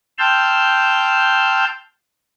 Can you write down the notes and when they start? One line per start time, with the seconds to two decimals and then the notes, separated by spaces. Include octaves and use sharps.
0.18 G5 A5 C6 E6 F6 G6